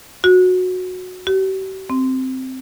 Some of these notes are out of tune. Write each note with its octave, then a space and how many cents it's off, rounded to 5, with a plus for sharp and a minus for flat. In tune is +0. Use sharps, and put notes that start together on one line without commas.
F#4 -15
G4 -45
C4 -5